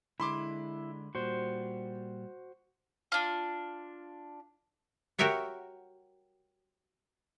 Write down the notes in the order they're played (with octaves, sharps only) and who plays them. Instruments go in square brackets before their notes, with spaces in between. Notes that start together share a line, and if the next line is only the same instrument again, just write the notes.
[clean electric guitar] D3 G#3 [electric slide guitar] E4 [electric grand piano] B5 C6 D6
[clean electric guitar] A#2 G3 [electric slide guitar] F#4 C5
[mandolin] D4 F4
[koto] F#4 G4 A#4 C#5 E5 F#5